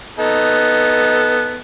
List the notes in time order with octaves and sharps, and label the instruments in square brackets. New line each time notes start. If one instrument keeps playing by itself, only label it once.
[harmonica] B3 D#4 A4